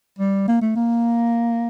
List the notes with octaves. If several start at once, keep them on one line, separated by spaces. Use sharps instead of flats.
G3
A#3
A3
A#3